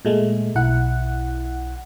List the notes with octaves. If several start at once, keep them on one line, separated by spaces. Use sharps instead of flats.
A#2 G#3 A3
B1 E4 F#5